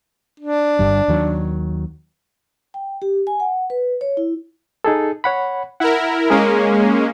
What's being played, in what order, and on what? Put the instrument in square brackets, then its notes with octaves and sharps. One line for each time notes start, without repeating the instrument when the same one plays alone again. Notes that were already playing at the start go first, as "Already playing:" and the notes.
[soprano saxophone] D4
[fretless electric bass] G1 G2 G3
D#2 D#3 F#3
[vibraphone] G5
G4
G#5
F#5
B4
C#5
E4
[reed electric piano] D#4 G#4 A4
C#5 F#5 B5
[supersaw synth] E4 A#4 [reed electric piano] F#5
[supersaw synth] G#3 A#3 C#4 [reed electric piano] G#4 A#4 C#5